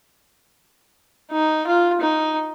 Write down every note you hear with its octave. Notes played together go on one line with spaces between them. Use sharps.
D#4
F4
D#4